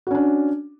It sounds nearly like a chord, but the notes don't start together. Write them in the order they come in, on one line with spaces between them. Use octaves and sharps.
F#4 C#4 D4